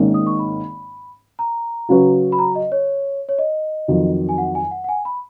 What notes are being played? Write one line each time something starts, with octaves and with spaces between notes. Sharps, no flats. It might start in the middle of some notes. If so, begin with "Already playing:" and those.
Already playing: G#1 G#2 D#3 A#3 C#4
D#6
C#6
B5
A#5
C#3 F#3 C#4 F#4 B4
B5
A#5
D#5
C#5
C#5
D#5
F2 D#3 F#3
G#5
F#5
G#5
F#5
F#5
G#5
B5